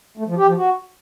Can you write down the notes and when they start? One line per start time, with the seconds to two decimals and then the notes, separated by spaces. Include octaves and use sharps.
0.17 A3
0.27 F3
0.37 G4
0.47 F3
0.57 F#4